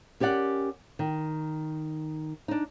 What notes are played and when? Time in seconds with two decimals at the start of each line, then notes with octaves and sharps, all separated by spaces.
0.20 C#4 G4 A#4 D5 F#5
0.99 D#3
2.48 D4 D#4